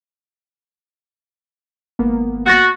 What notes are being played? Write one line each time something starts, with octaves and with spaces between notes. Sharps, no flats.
G#1 A#3 B3
F#4 F#6 A6 A#6